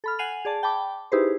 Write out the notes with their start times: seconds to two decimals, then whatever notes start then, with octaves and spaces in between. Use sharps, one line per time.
0.04 A4 B5 F6
0.19 F#5 G#5 C7 D#7 F7 F#7
0.45 G#4 D5 A5
0.63 G5 A5 B5 D6
1.12 D#4 E4 G4 G#4 B4 C5